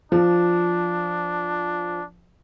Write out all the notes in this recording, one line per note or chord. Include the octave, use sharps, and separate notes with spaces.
F3 D4